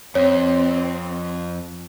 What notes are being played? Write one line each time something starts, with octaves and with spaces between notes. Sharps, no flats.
F2 C4 C#5